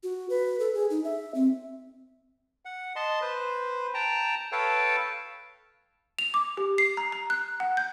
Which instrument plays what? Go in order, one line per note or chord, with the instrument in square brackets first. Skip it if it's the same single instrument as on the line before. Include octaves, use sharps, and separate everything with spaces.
[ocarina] F#4
B4
A4
G#4
D#4
E5
C4
[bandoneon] F#5
D#5 A5 C6
B4 C5
G5 A5 A#5
A4 B4 C#5 F5 G5 A5
[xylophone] F7
D6
G4
C7
A#5
A#5
F#6
F#5
G6